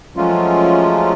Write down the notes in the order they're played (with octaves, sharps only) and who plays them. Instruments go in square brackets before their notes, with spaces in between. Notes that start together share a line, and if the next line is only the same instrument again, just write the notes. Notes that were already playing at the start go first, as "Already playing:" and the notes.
[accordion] F3 F#3 G#3 A3 C#4 F4